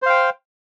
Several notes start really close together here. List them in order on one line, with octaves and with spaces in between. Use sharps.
C5 F5 G5